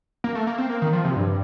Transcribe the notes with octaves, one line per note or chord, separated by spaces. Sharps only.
A#3
A3
A#3
C4
A#3
D#3
F3
C3
G2